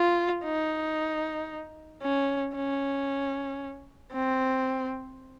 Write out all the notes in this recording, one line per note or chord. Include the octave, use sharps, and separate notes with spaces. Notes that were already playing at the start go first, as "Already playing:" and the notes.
Already playing: F4
D#4
C#4
C#4
C4